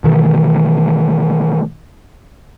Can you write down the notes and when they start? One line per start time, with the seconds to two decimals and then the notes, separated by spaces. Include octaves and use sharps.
0.04 B2 D#3 E3 A3